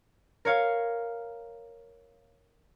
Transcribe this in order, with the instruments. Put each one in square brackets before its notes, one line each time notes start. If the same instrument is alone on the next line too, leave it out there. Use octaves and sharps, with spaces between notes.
[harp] A#4 C#5 F5